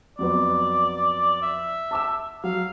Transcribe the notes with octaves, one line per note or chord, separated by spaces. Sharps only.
F2 F#3 B3 D5
E5
A5 D6 E6
F#3 F5